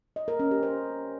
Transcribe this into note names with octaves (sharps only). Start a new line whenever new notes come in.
D#5
A#4
C#4
G4
C5